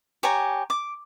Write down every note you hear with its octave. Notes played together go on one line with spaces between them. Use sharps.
G4 C#5 G#5 A#5
D6